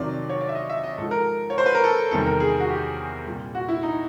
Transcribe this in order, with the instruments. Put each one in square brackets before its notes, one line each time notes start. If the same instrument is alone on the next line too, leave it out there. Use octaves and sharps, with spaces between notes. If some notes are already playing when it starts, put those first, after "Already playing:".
Already playing: [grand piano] F2 C3 D#3 F#3 D5
C#5
D5
E5
D#5
E5
D#5
G#2 F3 A4
A#4
C#5
C5
B4
A#4
A4
E2 C3 D#3 G3 A4
A#4
G#4
F#4
G4
C2 A#2 G3
F#4
E4
D#4